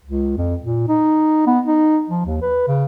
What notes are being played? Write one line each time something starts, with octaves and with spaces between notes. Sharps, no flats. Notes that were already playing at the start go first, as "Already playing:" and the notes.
C#2
F2
A#2
D#4
B3
D#4
F3
D#2
B4
C#3